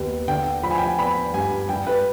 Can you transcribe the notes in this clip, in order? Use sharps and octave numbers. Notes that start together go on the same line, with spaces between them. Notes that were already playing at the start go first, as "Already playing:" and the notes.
Already playing: D#2 B3
D3 G5
F3 B5
G#5
G5
G#5
B3 B5
G2 G#5
G2 G5
B4